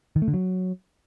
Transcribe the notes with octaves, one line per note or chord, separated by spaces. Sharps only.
D#3
A3
D3
F#3